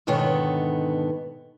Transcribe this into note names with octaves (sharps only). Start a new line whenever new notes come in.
G#2 B2 D3 D#3 B3 C#5